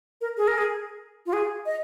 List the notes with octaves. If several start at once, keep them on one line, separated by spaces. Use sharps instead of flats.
A#4
G#4
A#4
G#4
F4
G#4
D#5